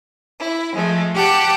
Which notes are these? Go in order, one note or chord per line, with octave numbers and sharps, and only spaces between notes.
E4
F3 G#3 A3
G4 F#5 G5 A5